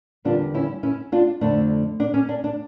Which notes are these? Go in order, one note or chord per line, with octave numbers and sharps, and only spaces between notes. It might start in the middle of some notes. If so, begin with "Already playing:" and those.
E2 D3 G3 A#3 D4 F4
C#4 E4
C#4 E4
D4 F4
F2 D3 A3 D4
D4
C#4
D4
D4